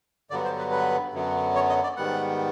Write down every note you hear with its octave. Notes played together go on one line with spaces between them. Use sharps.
G2 D3 F#3 B3 D5
C5
B4
B4
F#2 D3 F#3 B3
C#5
D#5
D5
G#2 D#3 G3 B3 F#5